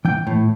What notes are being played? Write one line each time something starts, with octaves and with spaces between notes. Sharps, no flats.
E3 G5
A2